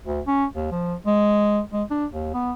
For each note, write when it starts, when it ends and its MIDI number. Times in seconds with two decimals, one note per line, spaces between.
0.06 0.21 38
0.27 0.46 61
0.56 0.67 39
0.71 0.95 53
1.06 1.61 56
1.73 1.84 56
1.91 2.06 62
2.11 2.31 39
2.34 2.52 59